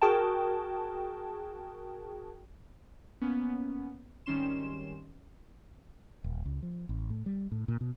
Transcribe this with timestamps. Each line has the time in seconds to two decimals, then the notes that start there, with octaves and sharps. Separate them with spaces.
0.02 F#4 G#4 A#4 G5 A5
3.21 A#3 B3 C#4
4.26 G#1 D#3 G3 C#4 C6 E7
6.24 D#1
6.45 C#2
6.63 F3
6.89 A1
7.10 A2
7.26 G3
7.52 A2
7.68 A#2
7.81 B2